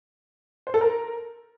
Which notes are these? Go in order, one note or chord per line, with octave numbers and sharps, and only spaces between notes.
C5
A4
A#4